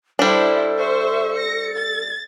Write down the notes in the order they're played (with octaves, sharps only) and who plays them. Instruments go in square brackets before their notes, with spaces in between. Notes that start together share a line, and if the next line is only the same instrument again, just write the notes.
[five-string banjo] G3 D4 [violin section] E4 C5 [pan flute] A4
[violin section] C5 E5 C#6
A#6 C#7
A6